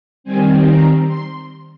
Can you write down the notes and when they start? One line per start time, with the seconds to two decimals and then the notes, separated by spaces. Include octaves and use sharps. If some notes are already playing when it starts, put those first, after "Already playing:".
0.24 D#3 G3 C4 G#5
0.66 A#5
1.07 C6